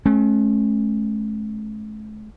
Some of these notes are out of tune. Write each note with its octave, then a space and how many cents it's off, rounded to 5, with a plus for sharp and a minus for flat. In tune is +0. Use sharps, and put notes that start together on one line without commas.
A3 -45 C#4 -25